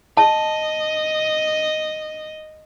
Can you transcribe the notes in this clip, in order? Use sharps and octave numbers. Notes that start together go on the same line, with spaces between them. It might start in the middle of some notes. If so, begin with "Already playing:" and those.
D#5 A5